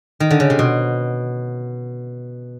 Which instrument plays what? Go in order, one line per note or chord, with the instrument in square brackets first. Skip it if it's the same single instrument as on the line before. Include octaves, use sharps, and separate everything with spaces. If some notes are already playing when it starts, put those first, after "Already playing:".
[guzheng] D#3
D3
C#3
C3
B2